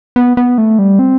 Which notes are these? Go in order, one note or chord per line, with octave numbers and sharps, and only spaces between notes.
B3
B3
A3
G3
C4